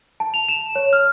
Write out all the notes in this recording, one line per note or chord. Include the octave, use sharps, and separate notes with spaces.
A5
F7
E7
C#5
F6